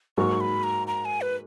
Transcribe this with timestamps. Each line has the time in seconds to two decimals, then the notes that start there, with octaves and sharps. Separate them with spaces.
0.18 G#2 F#3 A#3 C#6
0.41 B5
0.64 A#5
0.87 A#5
1.05 G#5
1.21 B4